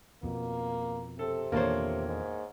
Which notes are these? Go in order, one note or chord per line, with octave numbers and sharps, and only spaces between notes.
F2 B2 A#3
C3 A4
E2 A#2 D#3 A#3 D4 A4 C5 C#5
G#2